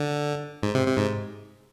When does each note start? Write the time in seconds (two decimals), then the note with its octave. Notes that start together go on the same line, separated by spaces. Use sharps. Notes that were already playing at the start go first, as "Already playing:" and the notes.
Already playing: D3
0.63 G#2
0.75 C3
0.87 C3
0.98 G#2